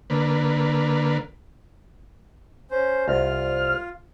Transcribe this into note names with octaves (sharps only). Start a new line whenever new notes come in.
D3 A#3 B4
C#4 C5
C2 F4 F6